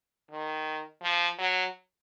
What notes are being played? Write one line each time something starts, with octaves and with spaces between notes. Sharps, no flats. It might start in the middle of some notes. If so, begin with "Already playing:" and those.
D#3
F3
F#3